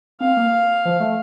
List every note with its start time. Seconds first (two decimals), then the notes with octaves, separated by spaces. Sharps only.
0.20 C4 F5
0.37 A#3
0.85 F3
1.00 A3